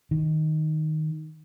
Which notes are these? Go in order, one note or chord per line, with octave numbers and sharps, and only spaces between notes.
D#3